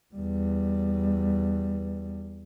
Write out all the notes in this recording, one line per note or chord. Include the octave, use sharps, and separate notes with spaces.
E2 G3